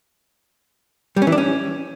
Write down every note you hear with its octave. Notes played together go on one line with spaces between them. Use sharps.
G3
C#4
E3
D4
C#4